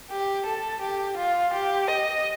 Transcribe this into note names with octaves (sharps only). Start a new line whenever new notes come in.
G4
A4
G4
F4
G4
D#5